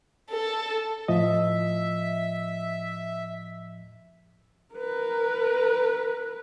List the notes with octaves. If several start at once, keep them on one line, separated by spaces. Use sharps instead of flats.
A4
A2 F3 D#5 E5
A#4 B4